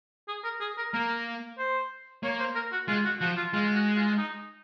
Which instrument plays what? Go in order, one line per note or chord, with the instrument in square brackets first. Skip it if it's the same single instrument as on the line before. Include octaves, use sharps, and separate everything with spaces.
[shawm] G#4
A#4
G#4
A#4
[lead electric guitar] A#3 [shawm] A#4
[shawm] C5
[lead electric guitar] A#3 [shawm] C#5
[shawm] C5
A#4
F#4
[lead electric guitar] G#3 [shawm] F4
[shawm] F#4
[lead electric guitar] F3 [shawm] F#4
[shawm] F4
[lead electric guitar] G#3 [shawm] F4
[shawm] F#4
F4
D#4